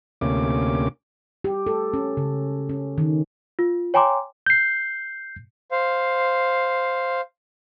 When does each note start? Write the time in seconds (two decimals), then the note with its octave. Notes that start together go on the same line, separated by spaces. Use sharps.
0.21 D2 C3 A#3 C#4 D6
1.44 G4
1.67 A4
1.94 C#4
2.17 C#3
2.69 C#4
2.98 D#3
3.59 F4
3.94 C#5 G5 G#5 A#5 C6 D6
4.46 G6 C7
5.72 C5 F5